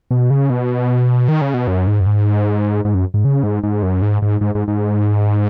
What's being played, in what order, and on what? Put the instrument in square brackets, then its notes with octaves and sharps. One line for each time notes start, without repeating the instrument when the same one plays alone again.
[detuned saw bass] B2
C#3
B2
D#3
C#3
B2
F#2
G#2
F#2
G#2
G#2
F#2
G#2
C#3
G#2
G#2
F#2
G#2
G#2
G#2
G#2
G#2